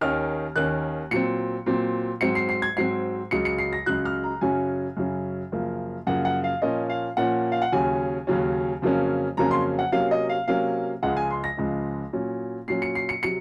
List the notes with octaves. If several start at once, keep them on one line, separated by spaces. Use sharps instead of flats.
D#2 D#3 A#3 C#4 F6
D#2 D#3 A#3 C#4 F#6
A#2 F#3 C4 C#7
A#2 F#3 C4
G#2 F#3 C4 C#7
C7
C7
G#6
G#2 F#3 C4 C7
C#2 C#3 F#3 C#7
C#7
C7
A#6
C#2 C#3 F#3 F#6
F6
A#5
F#2 C#3 F#3 C#4 G#5
F#2 C#3 F#3 C#4
F#2 C#3 F3 A#3
F#2 C#3 F3 A#3 F#5
F#5
F5
A#2 F3 A#3 C#4 D#5
F5
A#2 F3 A#3 C#4 F#5
F5
F#5
D#2 C#3 F#3 C#4 G#5
D#2 C#3 F#3 C#4
F2 C#3 F#3 A#3 C#4
F2 C#3 F#3 A#3 C#4 A#5
C6
F#5
C3 F#3 A#3 C#4 F5
D#5
F5
C3 F#3 A#3 C#4 F5
C#2 C#3 F3 G#3 F#5
G#5
C6
A#6
C#2 C#3 F3 G#3
A#2 F#3 C#4
A#2 F#3 C#4 C7
C#7
C7
C#7
C3 F#3 C#7